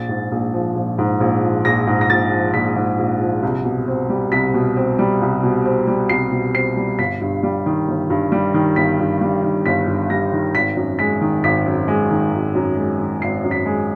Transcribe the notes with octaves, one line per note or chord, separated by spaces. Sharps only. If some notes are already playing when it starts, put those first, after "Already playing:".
Already playing: A#1 A6
G#2
A#1
F3
A#1
G#2
A#1
F3
A#1 A#6
G#2
A#6
A#1 A6
F3
A#1 B6
G#2
A#1
F3
C2
B2
C4
G3
C2 B6
B2
C4
G3
C2
B2
C4
G3
C2 C7
B2
C4 C7
G3
G1 B6
G2
G3
D#3
G1
G2
G3
D#3
G1 B6
G2
G3
D#3
G1 B6
G2
G3 A#6
D#3
G#1 B6
F#2
G#3 B6
D#3
G#1 B6
F#2
G#3
D#3
G#1
F#2
G#3
D#3
G#1 C7
F#2
B6
G#3